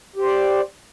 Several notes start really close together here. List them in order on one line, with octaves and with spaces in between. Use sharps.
G4 C5 D5